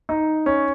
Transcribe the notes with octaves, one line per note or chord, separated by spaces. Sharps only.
D#4
C#4